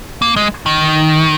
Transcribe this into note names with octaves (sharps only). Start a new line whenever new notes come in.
A#3
G#3
D#3